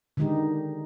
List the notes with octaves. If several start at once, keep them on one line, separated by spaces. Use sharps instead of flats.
D3 D#3 G#3 D#4 G4